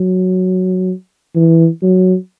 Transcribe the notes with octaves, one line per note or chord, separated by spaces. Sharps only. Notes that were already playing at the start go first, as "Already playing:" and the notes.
Already playing: F#3
E3
F#3